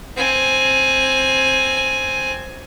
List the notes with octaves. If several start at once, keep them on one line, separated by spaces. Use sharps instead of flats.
C4 G#5